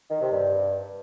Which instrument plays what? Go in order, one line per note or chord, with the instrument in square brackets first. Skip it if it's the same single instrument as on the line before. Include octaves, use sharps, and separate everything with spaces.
[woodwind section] D#3
C3
G2